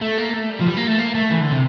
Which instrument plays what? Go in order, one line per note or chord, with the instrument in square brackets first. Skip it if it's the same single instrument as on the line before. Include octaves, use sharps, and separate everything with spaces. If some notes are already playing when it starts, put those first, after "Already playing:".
[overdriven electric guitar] A3
A#3
A3
G3
F3
G3
A#3
A3
A#3
A3
E3
D3
C3